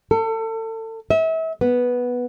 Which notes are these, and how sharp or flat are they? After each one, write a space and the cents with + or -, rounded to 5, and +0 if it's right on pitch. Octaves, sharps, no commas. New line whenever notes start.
A4 +30
E5 -35
B3 -5